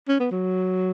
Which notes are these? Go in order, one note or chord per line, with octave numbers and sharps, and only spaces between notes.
C#4
B3
F#3